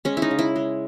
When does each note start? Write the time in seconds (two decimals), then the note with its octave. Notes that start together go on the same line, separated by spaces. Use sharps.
0.05 G#3 C#4
0.17 E4
0.22 D#4
0.31 C#3
0.39 E4
0.56 G#3